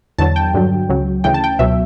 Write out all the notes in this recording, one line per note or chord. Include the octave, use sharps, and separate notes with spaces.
E2 D3 F#3 A5
G5
G2 D3 F#3
C#2 C#3 F#3
D2 C#3 E3 G5
A5
G5
C#2 B2 F#3 E5